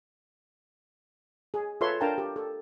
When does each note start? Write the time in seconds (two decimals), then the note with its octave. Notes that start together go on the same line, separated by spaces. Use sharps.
1.54 G#4
1.81 F4 A4 B4 C#5 E5 C6
2.01 D4 A#4 F5 G5 A5 A#5
2.18 G4
2.36 A4